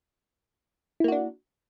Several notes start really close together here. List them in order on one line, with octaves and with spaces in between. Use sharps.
E4 A#3 F#4 D4